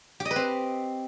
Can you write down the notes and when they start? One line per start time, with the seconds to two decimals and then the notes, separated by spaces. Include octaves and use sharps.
0.20 G4
0.25 D#5
0.31 B4
0.36 C4